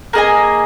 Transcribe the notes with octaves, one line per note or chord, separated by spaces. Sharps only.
A#3 G#4 D#5 G#5